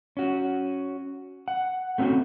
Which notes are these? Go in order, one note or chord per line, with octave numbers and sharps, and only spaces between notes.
C#4 F#4
F#5
A3 C4 C#4 F#4